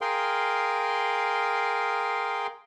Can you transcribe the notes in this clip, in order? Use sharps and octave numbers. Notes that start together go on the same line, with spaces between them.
G#4 A#4 F5 G5 C6